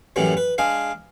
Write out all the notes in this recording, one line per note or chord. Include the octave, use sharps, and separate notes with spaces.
F#2 A2 E3 F#3 G3
B4
G#3 D4 G#4 F5